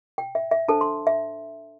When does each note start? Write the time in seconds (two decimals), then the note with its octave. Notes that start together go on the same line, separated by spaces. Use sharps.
0.18 G5
0.35 E5
0.51 E5
0.68 D4 A4 C5 A5
0.81 C6
1.07 E5